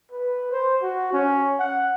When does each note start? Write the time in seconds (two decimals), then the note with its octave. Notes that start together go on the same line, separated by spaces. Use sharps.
0.12 B4
0.51 C5
0.82 F#4
1.13 C#4
1.59 F#5